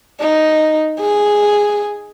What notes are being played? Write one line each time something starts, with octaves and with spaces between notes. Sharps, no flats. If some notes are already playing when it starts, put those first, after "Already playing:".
D#4
G#4